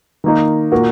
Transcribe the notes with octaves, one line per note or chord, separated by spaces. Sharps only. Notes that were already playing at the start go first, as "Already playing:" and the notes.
D#3 A#3 D#4
A#2 A#3 F#4 A#4